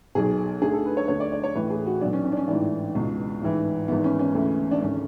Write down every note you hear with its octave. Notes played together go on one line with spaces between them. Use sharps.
B1 B2 G#4
D2 D3 G#4
A4
B4
C#5
D2 D3 C#5
D5
D5
C#5
A1 A2 E3 B4
G#4
F#4
B1 B2 D4
C#4
C#4
D4
C#4
A1 G#2 E3 D4
C#2 B2
A1 G#2 E3
G#1 G#2 E3 B3
C#4
C#4
D2 C#3 E3
D4
G#1 C#3 C#4